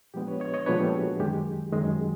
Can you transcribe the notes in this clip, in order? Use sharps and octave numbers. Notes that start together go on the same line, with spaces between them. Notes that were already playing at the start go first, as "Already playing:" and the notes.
A#2 F3 G#3 B3 D4 G4
B4 C#5
C#5 D#5
C#5 D#5
A#2 F3 G#3 B3 D4 B4 C#5
G4 A4
F#4 G#4
F#2 D#3 G#3 G4
F#2 D#3 G#3